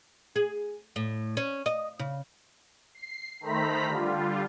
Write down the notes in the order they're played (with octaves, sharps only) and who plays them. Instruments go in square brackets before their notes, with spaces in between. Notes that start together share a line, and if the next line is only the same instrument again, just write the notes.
[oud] G#4
A2
C#4
D#5
C#3
[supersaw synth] C7
D#3 A3 C5 A#5 B5 B6
D3 G3 F4